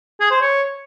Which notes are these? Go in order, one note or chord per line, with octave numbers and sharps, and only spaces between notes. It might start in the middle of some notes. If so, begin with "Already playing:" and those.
G#4
C5
C#5